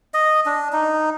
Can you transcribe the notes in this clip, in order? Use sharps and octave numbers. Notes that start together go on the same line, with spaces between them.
D#5
D4
D#4